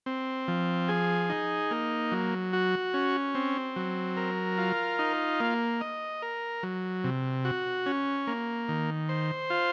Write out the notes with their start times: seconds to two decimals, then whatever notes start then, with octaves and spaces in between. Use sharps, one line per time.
0.06 C4
0.48 F3
0.88 G#4
1.30 D#4
1.71 A#3
2.12 F#3
2.53 F#4
2.94 C#4
3.35 C4
3.76 F#3
4.17 A#4
4.58 F4
4.99 D#4
5.40 A#3
5.81 D#5
6.22 A#4
6.63 F#3
7.04 C3
7.45 F#4
7.86 C#4
8.27 A#3
8.68 D#3
9.09 C5
9.50 F4